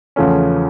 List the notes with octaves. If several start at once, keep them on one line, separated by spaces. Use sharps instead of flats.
E2 C#3 F3 A3 C#4